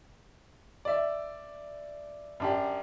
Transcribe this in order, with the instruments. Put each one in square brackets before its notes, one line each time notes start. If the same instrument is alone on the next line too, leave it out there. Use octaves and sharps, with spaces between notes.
[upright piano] D5 E5
F#2 D4 G4